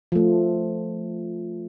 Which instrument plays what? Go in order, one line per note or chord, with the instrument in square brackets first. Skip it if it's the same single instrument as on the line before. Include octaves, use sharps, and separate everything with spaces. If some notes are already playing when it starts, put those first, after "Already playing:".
[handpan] F3 A3